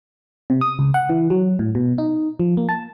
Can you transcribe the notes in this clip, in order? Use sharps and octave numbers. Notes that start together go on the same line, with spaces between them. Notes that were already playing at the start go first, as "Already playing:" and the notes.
C3
D#6
C#2
F#5
E3
F#3
A2
B2
D#4
F3
A#3
A5